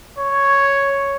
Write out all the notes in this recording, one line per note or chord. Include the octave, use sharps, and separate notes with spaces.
C#5